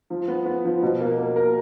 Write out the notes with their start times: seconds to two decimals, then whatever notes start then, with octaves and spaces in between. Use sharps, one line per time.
0.10 F3
0.28 B3
0.46 B3
0.65 F3
0.82 B2
1.00 A#3
1.18 A#3
1.36 A#4